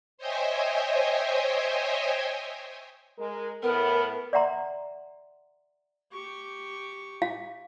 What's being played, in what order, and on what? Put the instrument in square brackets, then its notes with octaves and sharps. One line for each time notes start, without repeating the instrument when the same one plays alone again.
[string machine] C5 C#5 D#5 E5 G5 G#5
[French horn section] G#3 A#4
[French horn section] A2 B3 [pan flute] A#4
[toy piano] D5 E5 F#5 A#5 C6
[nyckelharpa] G4 C#6
[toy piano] F5